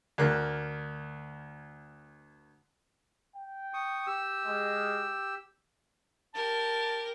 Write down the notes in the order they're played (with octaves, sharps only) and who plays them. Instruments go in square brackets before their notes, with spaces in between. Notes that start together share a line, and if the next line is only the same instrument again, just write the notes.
[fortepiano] D2 A#3 F#6
[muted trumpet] G5
[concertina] C#6 D#6
G4 E6
[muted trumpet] G#3
[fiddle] G4 A#4 [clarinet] A5